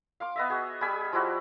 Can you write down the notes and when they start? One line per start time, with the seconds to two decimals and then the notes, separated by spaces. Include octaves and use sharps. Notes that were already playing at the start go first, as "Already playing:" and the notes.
0.20 F5 C6 D6
0.36 B3 D#5 E5
0.50 F#4 G#4
0.81 G3 G#4 G#5 B5
1.13 F3 G3 E4 F#4